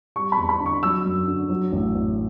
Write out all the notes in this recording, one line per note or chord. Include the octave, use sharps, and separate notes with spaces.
G3 C#6
B5
E2
B5
D3
C#6
F#3 E6
F#2
D3
F#3
A1
A2